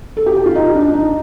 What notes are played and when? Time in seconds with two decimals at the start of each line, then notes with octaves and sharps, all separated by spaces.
0.17 A4
0.26 G4
0.36 G4
0.46 F4
0.55 D#4
0.74 D4
0.93 D#4